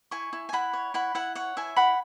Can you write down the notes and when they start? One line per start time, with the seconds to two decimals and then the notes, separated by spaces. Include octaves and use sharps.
0.11 E4 G#5 C#6
0.33 E4
0.49 G#5
0.53 E4 F#5 B5
0.73 C#5
0.94 E4 F#5 B5
1.15 E4 F#5
1.35 C#5 F#5
1.57 E4 E5 G#5
1.76 E4 F#5 B5